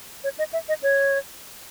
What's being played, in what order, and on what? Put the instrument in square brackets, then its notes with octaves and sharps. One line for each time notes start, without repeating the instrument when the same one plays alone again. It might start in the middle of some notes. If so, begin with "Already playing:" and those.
[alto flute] C#5
D#5
E5
D#5
C#5